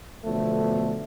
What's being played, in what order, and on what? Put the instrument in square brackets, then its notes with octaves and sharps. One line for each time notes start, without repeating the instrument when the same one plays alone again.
[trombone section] E2 B2 D3 F3 A3